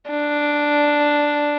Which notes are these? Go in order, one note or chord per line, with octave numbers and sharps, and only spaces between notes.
D4